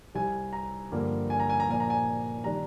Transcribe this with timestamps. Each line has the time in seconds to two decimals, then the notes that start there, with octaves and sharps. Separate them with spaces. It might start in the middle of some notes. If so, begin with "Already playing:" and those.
0.15 C2 C3 G3 G#5
0.53 A#5
0.92 G2 D3 F3 A#3
1.30 G#5
1.40 A#5
1.50 G#5
1.60 A#5
1.68 A#2 F3 A#3 D4 G#5
1.80 A#5
1.90 G#5
2.44 D#3 G3 D4 A#5